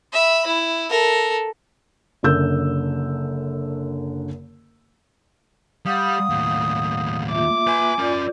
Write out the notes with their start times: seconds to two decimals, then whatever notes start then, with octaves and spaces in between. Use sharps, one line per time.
0.13 E5 B5
0.47 E4
0.90 A4 A#4
2.23 F#1 F#2 D3 E6 G6
5.86 G3 F5 F#5 D#6
6.30 D#2 A2
7.30 A#3 F4 E5 D6
7.67 B4 G#5 C6
7.99 C#4 F4 A#4 D5